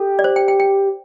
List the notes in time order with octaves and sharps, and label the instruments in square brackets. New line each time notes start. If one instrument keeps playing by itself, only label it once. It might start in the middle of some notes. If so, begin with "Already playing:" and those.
Already playing: [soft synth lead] G4 [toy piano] A4
[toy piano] D5
C5
G5
G5
G5